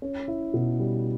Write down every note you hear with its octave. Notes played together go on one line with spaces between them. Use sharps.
C#4
E4
B2
G3